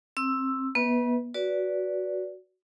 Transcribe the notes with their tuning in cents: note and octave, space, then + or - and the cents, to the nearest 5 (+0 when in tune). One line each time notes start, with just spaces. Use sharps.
C4 +20 E6 +0
B3 -35 B4 +0 E5 -30
F#4 +0 B4 -15 D5 -20